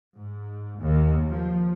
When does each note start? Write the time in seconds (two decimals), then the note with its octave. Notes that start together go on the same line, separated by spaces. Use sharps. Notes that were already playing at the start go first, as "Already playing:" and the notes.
0.16 G#2
0.79 D#2
1.30 F3